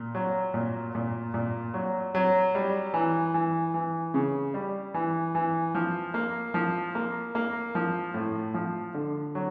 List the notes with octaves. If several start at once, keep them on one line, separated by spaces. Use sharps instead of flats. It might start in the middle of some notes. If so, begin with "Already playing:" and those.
Already playing: A#2
F#3
A#2
A#2
A#2
F#3
F#3
G3
E3
E3
E3
C#3
G3
E3
E3
F3
A#3
F3
A#3
A#3
F3
A2
F3
D3
F#3